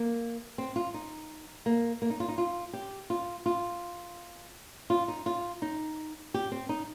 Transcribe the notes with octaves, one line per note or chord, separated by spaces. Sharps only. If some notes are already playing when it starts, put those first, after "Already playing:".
Already playing: A#3
C4
F4
D#4
A#3
A#3
D#4
F4
D#4
F4
G4
F4
F4
F4
D#4
F4
D#4
G4
C4
D#4